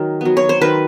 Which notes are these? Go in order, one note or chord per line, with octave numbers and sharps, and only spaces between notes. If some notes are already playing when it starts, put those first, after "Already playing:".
Already playing: D#3 F#3
F#3 B3
C#5
C5
D#3 B4